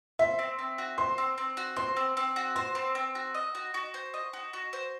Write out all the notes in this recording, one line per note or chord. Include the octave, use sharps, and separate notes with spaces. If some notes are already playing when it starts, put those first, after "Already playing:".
C5 E5
C4
C4
F#4
C5 C6
C4
C4
F#4
C5 C6
C4
C4
F#4
C5 C6
C4
C4
F#4
D#5
F#4
F#4
C5
D#5
F#4
F#4
C5